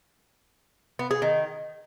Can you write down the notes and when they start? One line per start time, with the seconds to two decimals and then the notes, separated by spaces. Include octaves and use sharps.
0.99 B3
1.11 G#4
1.22 D#3